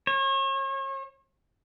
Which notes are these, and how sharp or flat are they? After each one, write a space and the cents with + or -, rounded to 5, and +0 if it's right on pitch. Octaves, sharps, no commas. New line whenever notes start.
C#5 -40